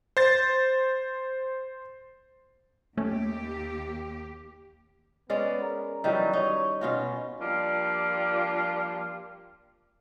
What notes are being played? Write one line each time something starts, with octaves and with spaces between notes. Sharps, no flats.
C5 A6
D#2 A3 C#4 G4
G#3 B3 C#4 D5
A#4
D#3 E3 F#3 G3
D#4 C#5
B2 C#4 F4 F#4
F3 G3 A#3 D4 F4